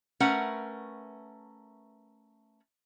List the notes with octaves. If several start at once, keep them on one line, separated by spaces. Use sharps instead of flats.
A3 C#4 A#4 B4 F#5